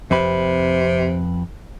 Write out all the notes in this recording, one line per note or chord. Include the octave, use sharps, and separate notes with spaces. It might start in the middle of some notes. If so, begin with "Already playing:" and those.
F2 C3 B4